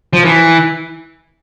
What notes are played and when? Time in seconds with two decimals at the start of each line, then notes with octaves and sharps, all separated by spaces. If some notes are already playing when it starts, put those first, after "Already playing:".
0.13 F3
0.25 E3